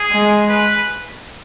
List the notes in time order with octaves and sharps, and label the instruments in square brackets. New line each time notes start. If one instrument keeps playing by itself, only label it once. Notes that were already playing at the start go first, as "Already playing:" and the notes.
Already playing: [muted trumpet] G#4
[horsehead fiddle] G#3
[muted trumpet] B4